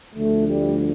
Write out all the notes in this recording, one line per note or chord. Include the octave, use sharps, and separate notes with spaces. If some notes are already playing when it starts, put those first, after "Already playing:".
D2 D3 F3 A3
G3